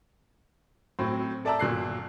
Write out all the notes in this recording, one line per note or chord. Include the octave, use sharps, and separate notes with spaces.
A2 F#3 C4
A4 D5 E5 A5 A#5 E6
G1 A#2 F#3 F#6 C7